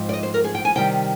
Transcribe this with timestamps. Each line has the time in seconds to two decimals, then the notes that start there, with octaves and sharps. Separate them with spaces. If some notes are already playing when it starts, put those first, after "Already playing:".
Already playing: G#2 F3 C4
0.09 D5
0.13 D#5
0.23 C5
0.34 A#4
0.44 G#4
0.55 G5
0.65 G#5
0.75 C3 D#3 G3 G5